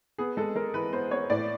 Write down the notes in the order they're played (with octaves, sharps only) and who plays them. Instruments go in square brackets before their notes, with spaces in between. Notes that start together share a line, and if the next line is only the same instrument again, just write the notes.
[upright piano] B3 G#4
G#3 A4
G#3 A#4
E3 B4
B3 C5
B3 C#5
A2 D5